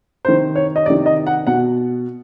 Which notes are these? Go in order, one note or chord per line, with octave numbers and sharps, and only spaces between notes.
C3 D#3 C5
C#5
D#5
C3 D#3 D5
D#5
F#5
B2 F#5